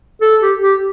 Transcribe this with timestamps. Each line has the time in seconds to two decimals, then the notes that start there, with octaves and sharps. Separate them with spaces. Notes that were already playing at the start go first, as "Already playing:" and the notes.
0.21 A4
0.41 G4
0.62 G4